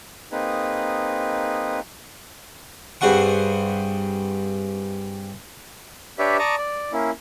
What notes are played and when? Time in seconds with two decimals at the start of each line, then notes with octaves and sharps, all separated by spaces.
0.32 A#3 C4 D#4 G#4 B4
3.01 G2 C4 G#4 F#5 C#6
6.19 D4 G4 B4 C#5 D5 E5
6.39 D5 A5 A#5 C#6 D#6
6.57 D5
6.92 A#3 C#4 E4